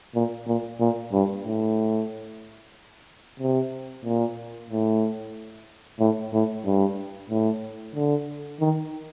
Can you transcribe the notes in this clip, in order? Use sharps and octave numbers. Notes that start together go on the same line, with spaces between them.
A#2
A#2
A#2
G2
A2
C3
A#2
A2
A2
A2
G2
A2
D3
D#3